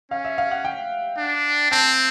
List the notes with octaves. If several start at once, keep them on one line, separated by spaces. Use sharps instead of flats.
C#4 F5
E5
F5
F#5
G5
D4
C4 A5